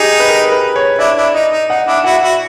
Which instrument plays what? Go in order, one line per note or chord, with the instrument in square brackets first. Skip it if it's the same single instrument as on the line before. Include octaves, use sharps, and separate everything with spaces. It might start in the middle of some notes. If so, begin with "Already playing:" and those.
Already playing: [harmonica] D#4 [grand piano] G4 G#4
[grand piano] B4
A#4
B4
C#5
[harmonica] D4 E4 [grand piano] D5
[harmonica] D4 E4
[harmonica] D#4 [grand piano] D#5
[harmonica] D#4
[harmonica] D#4 [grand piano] F#5
[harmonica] D4 E4
[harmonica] E4 F#4 [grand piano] F#5
[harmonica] E4 F#4